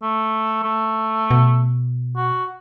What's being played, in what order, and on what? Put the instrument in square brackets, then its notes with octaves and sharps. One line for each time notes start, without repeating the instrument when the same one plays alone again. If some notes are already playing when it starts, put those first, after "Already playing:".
[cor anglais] A3
A3
[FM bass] B2
[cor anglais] F#4